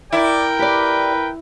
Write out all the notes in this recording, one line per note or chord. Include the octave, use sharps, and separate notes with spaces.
E4 A#4 D5 G5
G4 B4 D5